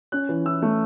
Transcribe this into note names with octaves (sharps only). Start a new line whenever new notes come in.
C#4 F#6
E3
E4 E6
A3